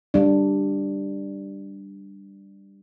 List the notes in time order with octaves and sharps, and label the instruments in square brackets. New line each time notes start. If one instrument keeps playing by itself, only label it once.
[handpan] G3 D4